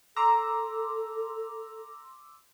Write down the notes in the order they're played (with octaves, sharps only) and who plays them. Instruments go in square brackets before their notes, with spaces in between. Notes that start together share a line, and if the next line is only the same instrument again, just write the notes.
[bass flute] A4 [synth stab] A#5 [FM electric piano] C6 D6 E6